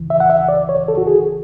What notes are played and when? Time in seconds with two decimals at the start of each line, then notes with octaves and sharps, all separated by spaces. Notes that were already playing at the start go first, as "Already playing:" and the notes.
Already playing: C#2 C#3 E3
0.10 E5
0.20 F#5
0.30 E5
0.48 D5
0.69 C#5
0.88 A4
0.98 F#4
1.07 G#4